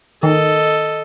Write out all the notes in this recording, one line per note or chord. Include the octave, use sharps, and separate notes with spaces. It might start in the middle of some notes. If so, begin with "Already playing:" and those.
D#3 A4 D#5